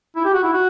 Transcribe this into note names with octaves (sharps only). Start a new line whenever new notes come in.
E4
G4
F#4
E4
F#4